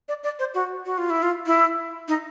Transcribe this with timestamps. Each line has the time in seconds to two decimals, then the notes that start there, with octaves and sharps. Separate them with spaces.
0.09 D5
0.23 D5
0.39 C5
0.54 F#4
0.86 F#4
0.98 F4
1.10 E4
1.23 F4
1.46 E4
2.08 D#4